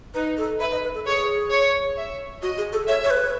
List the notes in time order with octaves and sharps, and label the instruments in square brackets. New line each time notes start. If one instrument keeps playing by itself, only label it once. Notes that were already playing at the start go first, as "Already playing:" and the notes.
[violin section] D#4 [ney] B4
[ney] A4
[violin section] B4 [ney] E5
[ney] D#5
B4
A4
[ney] G#4 [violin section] C#5
[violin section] C#5
E5
[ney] F#4 [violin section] D#5
[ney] G#4
A4
[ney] C#5 [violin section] E5
[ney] C#5
B4